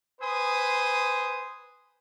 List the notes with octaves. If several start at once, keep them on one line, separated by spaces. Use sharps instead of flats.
B4 C5 G#5 C6 D#6